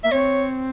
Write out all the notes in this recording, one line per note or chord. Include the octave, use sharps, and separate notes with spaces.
A#3 E5
C4 C#5